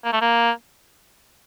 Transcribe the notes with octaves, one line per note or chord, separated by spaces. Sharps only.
A#3
A3
A#3